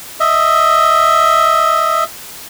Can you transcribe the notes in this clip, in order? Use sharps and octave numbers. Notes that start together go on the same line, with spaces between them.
D#5 E5